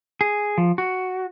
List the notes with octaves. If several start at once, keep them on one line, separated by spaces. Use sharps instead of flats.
G#4
F3
F#4